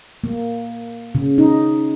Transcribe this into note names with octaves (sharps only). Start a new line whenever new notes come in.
A#3
C#3
D#4